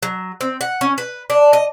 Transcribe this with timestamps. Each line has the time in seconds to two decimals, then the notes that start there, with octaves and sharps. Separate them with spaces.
0.03 F#3
0.41 C4
0.61 F#5
0.81 C#4
0.98 B4
1.30 D4
1.53 D#5